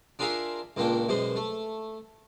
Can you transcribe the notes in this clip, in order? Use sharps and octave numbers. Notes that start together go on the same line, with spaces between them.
D4 F4 G#4 A#4 E5 F5
C#2 A#2 A#3 D4 G5
F#2 B2 G#3 C5
A3